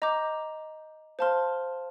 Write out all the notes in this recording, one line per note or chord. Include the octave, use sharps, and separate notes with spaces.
D#5 A#5 D6 G6
C5 F5 A5 C6 F6